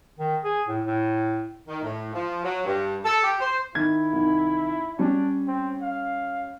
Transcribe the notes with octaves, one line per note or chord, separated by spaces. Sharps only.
D#3
G#4
A2
A2
D#3
A2
F3
F#3
G2
A4
G4
C5
D#3 E4 G#6
C2 D#3
G3 C#4 D4
C4
F5